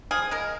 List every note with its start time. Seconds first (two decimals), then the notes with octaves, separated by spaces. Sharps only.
0.11 F3 G#4
0.31 G#3 A#4